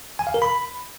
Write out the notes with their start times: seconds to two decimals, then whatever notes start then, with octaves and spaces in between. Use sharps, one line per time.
0.19 G#5
0.27 F5
0.34 A#4
0.42 B5